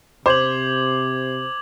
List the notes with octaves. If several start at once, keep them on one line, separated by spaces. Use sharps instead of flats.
C3 C5 D6 G#6 F#7